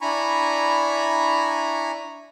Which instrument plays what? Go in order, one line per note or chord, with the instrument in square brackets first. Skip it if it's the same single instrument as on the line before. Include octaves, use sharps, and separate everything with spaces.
[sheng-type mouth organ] D4 E4 G#5 A#5 B5 C#6